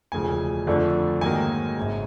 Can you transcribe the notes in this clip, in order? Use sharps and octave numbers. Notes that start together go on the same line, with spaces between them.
E1 D2 C#3 F3 G#5
F2 D3 F3 A3 D4
G#2 D#3 F#3 A#3 G#5
G#1 F#2 C#3